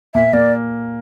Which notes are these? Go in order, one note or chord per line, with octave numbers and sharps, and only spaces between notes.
A#2 A#3 E5
A#2 A#3 D5